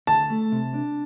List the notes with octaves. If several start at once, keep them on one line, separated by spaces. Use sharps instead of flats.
D2 A5
A3
C3
D4